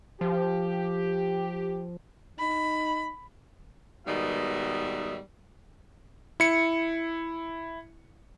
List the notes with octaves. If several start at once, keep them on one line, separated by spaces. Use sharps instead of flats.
F3 G4
D#4 B5
G#2 B2 D#3 G3 B3 E5
E4 C#7